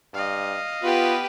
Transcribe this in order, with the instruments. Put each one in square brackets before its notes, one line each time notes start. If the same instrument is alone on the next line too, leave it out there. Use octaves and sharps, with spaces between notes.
[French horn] G2 [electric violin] D#5 F5
[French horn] B3 [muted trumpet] F4 [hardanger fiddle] G4 B4